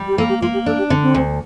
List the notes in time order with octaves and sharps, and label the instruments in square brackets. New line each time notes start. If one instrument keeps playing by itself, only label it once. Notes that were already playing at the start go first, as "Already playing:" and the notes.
Already playing: [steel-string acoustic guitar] G3
[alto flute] G4
[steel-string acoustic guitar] A#3 [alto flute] A4
[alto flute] G4
[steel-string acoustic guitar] A#3 [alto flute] F4
[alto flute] G4
[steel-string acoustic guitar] D4 [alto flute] A4
[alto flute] G4
[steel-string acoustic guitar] D3 [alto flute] C4
[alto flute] C4
[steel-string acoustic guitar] D2